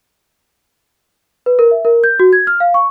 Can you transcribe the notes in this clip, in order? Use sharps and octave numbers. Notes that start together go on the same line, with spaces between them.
B4
A#4
E5
A#4
G6
F#4
G#6
F6
F5
C#6